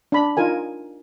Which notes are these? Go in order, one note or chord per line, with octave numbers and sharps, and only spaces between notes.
D4 B5
D#4 F4 A#4 G#5